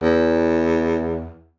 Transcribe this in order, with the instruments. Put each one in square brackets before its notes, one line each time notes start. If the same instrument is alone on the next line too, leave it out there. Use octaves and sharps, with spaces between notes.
[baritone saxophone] E2